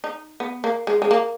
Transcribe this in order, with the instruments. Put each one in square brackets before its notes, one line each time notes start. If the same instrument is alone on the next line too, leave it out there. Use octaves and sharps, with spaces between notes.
[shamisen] D#4
B3
A#3
G#3
G#3
A#3